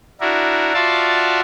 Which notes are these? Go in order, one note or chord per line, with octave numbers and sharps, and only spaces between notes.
D4 E4 F#4 A#4
F4 F#4 D5 E5 F5 A5